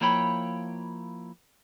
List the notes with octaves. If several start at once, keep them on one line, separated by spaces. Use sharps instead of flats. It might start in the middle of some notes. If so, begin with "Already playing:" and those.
F3 A#3 E4 C#5 G5 B5